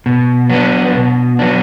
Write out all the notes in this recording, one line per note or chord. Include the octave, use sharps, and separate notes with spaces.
B2
F#3 B3 D4
B2
F#3 B3 D4